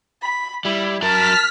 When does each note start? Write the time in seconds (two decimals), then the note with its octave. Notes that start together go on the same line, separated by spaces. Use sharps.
0.22 B5
0.65 G3 E4
1.02 F#3 A#4 A5 F6 B6